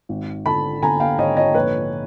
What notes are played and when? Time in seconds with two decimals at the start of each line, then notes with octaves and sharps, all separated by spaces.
0.09 G#1
0.46 D3 A5 B5
0.82 D3 G#5 A#5
1.00 F5 G5
1.18 G#1 C#5 D#5
1.37 C#5 D#5
1.54 A#1 B4 C#5